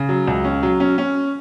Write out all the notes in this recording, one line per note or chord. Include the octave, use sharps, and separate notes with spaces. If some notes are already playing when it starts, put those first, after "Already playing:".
Already playing: C#3
F#3
C#2
C#4
F#3
C#4
C#4